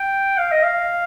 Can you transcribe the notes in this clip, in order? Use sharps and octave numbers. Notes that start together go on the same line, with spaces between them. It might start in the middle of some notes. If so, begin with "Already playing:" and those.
Already playing: G5
F5
D#5
F5